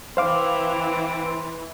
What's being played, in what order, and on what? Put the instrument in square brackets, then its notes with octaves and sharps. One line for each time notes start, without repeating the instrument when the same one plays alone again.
[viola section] E3 [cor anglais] C4 [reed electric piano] C5 F5 D6